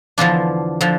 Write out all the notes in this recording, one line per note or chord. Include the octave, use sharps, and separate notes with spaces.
E2 D3 F3 D4 F4
D3 F3